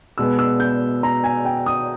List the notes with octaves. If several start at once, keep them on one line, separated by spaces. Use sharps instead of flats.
B2 G#3 B3 E6
E6
G6
A#5
G#5
G5
D#6